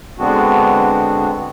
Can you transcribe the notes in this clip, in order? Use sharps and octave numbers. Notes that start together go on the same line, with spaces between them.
D3 G#3 B3 C4 D4 F#4